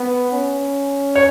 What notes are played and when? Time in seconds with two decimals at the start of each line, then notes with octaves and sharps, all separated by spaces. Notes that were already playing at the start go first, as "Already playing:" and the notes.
Already playing: B3
0.33 C#4
1.15 C#5